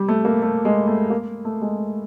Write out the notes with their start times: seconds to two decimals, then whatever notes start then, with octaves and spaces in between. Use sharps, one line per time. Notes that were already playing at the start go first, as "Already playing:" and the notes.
Already playing: G3
0.08 A3
0.25 A#3
0.42 A3
0.65 G#3
0.88 A3
1.10 A#3
1.45 A3
1.61 G#3